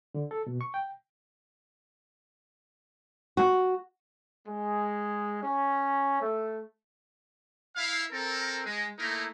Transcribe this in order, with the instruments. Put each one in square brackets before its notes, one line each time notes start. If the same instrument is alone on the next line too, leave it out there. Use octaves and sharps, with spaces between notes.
[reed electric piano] D3
A4
B2
C#6
G5
[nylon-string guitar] F#4
[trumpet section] G#3
C#4
A3
E4 F5
C4 A4 A#4
G#3
A3 A#3 D#4 E4 A#4